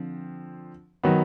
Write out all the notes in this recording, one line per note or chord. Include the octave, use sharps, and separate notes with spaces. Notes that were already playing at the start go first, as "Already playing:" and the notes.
Already playing: D3 F3 C4
D#3 F#3 B3